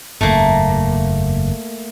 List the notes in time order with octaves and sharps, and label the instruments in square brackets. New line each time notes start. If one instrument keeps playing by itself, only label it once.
[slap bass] F#1 E2 G#2 [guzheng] A3 A#3